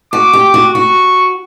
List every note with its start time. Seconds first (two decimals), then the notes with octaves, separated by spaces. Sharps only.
0.13 F#4 D6
0.33 G4
0.54 F#4
0.74 F#4 C#6